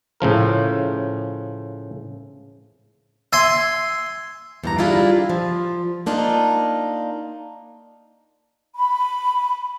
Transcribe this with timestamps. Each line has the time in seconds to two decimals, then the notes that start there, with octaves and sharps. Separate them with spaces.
0.20 A2 C#3 F3 A#4
3.33 E5 G#5 C6
4.64 E2 G2 A#5
4.78 G3 D4 E4 F4 G4 G#4
5.29 F3
6.06 A#3 D4 D#4 F4
8.75 B5